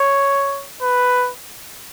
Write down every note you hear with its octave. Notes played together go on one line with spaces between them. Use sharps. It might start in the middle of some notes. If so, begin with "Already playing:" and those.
Already playing: C#5
B4